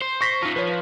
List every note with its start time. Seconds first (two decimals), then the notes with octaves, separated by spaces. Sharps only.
0.02 C5
0.21 C#6 A#6 B6
0.43 D#4 F4
0.56 F3 B4 C#5